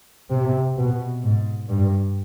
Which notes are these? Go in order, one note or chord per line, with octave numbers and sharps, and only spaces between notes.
C3
B2
G#2
G2